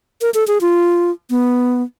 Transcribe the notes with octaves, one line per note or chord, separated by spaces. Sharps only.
A#4
A4
G#4
F4
B3